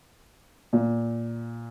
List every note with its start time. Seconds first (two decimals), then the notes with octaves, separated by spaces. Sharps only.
0.73 A#2